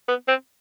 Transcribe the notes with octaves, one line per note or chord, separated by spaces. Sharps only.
B3
C4